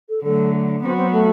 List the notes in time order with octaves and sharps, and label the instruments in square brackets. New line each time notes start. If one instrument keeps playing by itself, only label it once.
[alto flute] A4
[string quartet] D3 F#3 A3 [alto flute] A4
[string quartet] F#3 B3 F#4 [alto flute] C4
[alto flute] C4
A3